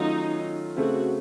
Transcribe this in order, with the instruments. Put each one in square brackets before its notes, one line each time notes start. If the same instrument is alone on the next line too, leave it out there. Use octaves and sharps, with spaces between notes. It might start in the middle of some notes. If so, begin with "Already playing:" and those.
Already playing: [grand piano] D#3 F#3 A3 C#4 F4 [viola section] D#4
[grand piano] C#3 A3 C4 [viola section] F#4